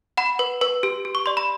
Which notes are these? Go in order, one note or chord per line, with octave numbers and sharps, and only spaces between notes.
F#5 B5
B4
B4
G4
G4
C#6
D5 C6
B5